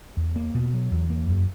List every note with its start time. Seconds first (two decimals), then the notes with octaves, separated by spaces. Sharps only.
0.17 E2
0.36 A#3
0.55 B2
0.73 F#3
0.91 E2
1.10 A#3
1.29 F#2